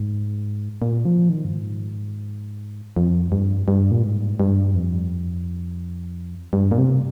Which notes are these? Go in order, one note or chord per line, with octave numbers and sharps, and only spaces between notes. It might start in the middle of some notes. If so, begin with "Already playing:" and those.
Already playing: G#2
A#2
F3
D#3
G2
G#2
F2
G2
G2
A#2
G#2
G2
F2
G2
A#2
C3